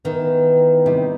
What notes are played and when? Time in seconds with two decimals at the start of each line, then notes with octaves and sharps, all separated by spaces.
0.05 D#3 E3 B3 E4
0.86 C3 G3 D#4 G4